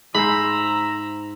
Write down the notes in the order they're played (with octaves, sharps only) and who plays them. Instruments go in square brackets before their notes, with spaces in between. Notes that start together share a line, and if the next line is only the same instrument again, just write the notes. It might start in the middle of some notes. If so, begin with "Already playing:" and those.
[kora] G#2 C5 [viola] E5 A#5 [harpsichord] B5